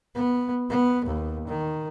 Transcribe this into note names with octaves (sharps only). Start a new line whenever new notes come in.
B3
B3
D#2
D#3